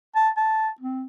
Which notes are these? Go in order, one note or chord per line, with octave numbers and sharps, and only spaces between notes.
A5
A5
C4